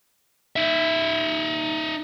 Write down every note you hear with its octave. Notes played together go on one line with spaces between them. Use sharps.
D#4 E5